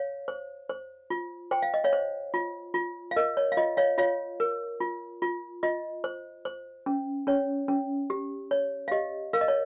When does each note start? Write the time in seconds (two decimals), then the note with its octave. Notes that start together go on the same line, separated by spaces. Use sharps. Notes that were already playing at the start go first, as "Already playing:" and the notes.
Already playing: C#5 F5
0.28 C5
0.70 C5
1.10 F4
1.51 C5 G5
1.62 F5
1.74 D#5
1.84 C#5 F5
1.93 C5
2.34 F4
2.74 F4
3.11 F5
3.16 A#4 D#5
3.37 C#5
3.52 F5
3.57 F4 D#5
3.77 C#5 F5
3.98 F4 C#5 F5
4.40 A#4
4.80 F4
5.22 F4
5.63 F4 D#5
6.04 C5
6.45 C5
6.86 C#4
7.27 C#4 C#5
7.68 C#4
8.10 G4
8.51 C#5
8.88 F5
8.92 G4 D#5
9.33 A#4 F5
9.41 D#5
9.48 C#5